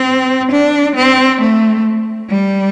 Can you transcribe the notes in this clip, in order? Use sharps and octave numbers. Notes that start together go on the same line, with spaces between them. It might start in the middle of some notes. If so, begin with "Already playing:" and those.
Already playing: C4
D4
C4
A3
G3